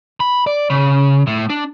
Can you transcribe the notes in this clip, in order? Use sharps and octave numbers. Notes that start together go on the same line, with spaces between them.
B5
D5
C#3
A2
D4